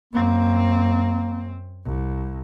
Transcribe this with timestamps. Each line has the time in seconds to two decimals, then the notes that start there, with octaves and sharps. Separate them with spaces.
0.14 F#2 A#3 C4
1.86 C2